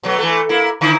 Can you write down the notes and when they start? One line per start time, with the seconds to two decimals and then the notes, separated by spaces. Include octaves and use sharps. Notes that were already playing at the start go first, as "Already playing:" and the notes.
0.03 B2 F#3 A3
0.18 E3 A3
0.49 A#3 E4
0.81 D3 D#4 E4